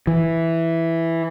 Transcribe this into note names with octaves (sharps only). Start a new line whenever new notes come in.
E3